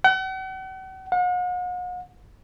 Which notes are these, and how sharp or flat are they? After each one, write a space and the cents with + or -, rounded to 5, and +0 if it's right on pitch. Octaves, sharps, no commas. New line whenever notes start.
F#5 +40
F#5 -45